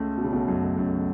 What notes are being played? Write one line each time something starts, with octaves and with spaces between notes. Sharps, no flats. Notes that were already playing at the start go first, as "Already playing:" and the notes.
Already playing: C#2 C#3 A3
B2
C#3
B1 B2
F#2
F#2